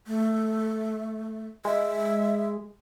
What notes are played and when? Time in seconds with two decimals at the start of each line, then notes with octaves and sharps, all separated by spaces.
0.07 A3
1.65 G#3 E5